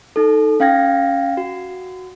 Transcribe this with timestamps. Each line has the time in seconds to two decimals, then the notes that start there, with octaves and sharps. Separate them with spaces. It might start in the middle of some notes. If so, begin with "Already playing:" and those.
0.16 D#4 A4
0.60 C#4 F5 G5 G#6 A#6
1.37 F#4